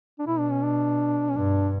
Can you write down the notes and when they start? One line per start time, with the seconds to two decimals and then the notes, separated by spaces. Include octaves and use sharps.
0.19 D4
0.26 B2 E4
0.39 D4
0.51 C#4
0.63 D4
1.29 C#4
1.35 G2 D4